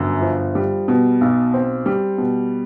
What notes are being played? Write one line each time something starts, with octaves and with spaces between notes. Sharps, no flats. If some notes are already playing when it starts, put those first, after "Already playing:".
Already playing: G1 F#2
F3
G3
B2
B1
C4
G3
B2